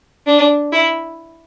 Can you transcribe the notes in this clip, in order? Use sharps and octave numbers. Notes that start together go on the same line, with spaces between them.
D4
E4